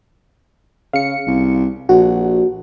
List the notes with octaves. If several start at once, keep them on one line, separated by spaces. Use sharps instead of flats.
C#3 F5 C#7
C2
A#1 F#4